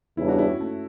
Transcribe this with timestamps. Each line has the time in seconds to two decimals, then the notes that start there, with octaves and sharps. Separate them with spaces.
0.17 E2 C#3 G3 D4 E4
0.28 F#4
0.38 E4
0.50 C#4
0.61 A3